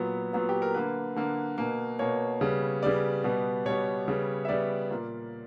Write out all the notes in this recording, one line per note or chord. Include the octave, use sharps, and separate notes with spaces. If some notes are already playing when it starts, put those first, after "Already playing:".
Already playing: A#2 F#3 B3
A#2 F#3 B3
G4
A#4
D3 A#3 B4
D3 A#3
B2 A#3
B2 A#3 C#5
C#3 G3 B3
C#3 G3 B3 D5
B2 G3 B3
B2 G3 B3 C#5
C#3 G3 B3
E5
C#3 G3 B3 D5
A#2 A#3